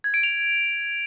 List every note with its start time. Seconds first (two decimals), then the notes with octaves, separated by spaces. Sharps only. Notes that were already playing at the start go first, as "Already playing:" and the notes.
0.04 G#6
0.14 D7
0.23 F7